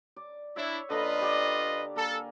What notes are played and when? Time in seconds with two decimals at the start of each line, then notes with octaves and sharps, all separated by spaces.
0.16 D5
0.56 D4 E4 C#5 E5
0.90 D3 A#3 F4 B4 D#5 B5
1.21 G4 D5
1.95 A#3 A4 G#5